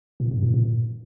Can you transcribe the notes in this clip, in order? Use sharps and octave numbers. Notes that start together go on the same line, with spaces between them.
A#2
G2
A#2
A#2